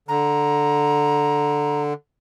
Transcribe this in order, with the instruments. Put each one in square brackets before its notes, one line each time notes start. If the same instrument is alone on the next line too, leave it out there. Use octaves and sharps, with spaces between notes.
[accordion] D3 [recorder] A#5